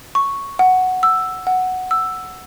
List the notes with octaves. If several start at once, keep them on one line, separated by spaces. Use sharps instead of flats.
C#6
F#5
E6
F#5
E6